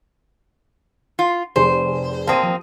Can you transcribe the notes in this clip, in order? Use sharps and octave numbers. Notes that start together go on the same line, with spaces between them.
F4
F1 G#4 C5
A#3 C4 A5 D#6 D#7
F3